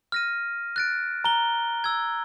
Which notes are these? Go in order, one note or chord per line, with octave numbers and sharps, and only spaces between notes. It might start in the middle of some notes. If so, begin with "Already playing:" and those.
F6 A#6 D#7
F#6 A6 D7
A#5 G7
E6 G#6